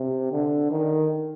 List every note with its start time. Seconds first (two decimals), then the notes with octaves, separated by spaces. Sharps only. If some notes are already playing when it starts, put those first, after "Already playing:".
Already playing: C3
0.32 D3
0.71 D#3